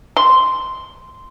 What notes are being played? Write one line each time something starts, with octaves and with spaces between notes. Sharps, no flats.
C6